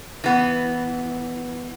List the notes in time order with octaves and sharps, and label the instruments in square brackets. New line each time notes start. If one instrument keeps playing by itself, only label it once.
[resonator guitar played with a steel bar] E3 B3